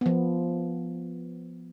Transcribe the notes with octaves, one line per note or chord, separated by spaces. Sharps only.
F3 B3